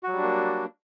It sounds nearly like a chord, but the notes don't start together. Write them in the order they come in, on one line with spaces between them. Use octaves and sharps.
F#4 F#3 G3 D4 A#3